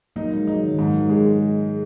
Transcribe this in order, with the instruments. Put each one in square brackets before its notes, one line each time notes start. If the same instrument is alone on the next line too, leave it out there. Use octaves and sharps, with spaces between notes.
[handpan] F#3 A#3 [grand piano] D#4
[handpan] G#3
[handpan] F#3 [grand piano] D#4
[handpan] D#3
D#3
[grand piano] G#2 [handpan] F#3
[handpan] G#3
[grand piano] G#3